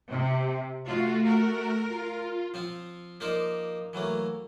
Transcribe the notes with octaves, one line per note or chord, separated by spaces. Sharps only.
C3
A3 F4 F#4
A#4
F4
F3 C4 F4
F3 A#3 D#4 A#4 C5 D5
E3 F#3 A3 A#3